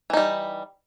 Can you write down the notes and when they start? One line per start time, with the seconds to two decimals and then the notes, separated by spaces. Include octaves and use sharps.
0.10 E3
0.13 D#4
0.17 G3